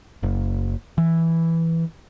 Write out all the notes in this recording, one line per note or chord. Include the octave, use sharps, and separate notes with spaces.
F#1
E3